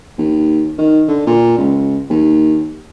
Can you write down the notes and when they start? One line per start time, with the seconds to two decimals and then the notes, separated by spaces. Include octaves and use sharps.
0.18 D#2
0.78 D#3
1.08 D3
1.27 A#2
1.58 C#2
2.10 D#2